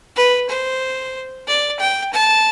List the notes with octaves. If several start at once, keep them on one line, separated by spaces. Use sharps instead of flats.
B4
C5
D5
G5
A5